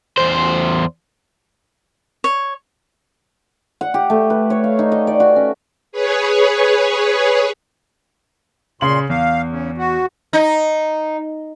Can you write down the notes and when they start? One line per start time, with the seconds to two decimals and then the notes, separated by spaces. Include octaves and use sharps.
0.17 E2 C5
2.24 C#5
3.81 F#5
3.94 G4
4.10 A3
4.30 B4
4.50 C#5
4.64 F5
4.79 D#4
4.92 D#5
5.07 D5
5.20 F#4
5.36 C#4
5.92 G#4 B4 C#5
8.81 A#2 C#3 C6 F#7
9.10 E2 F5
9.49 C#3
9.78 F#4
10.33 D#4